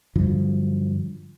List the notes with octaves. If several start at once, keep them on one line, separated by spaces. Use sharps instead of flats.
G2 D3 F3 F#3